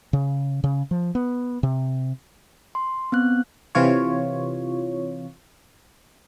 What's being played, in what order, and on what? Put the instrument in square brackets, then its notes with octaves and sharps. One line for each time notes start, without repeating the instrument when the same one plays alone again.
[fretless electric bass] C#3
C#3
F3
B3
C3
[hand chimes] C6
B3 C4 F#6
[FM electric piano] C3 E3 F4 C#5